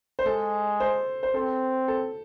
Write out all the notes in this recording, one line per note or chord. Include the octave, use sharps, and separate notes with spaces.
C5
G#3 A4
C5
C5
C4 A4
A4